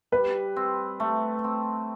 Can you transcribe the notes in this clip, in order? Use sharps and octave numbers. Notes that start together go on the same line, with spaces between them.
G3 B4
C4
A3
C4